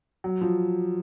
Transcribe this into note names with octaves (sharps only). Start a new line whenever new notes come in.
F#3
F3